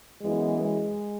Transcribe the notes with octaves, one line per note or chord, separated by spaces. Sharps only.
F#2 E3 G#3 B3
G#3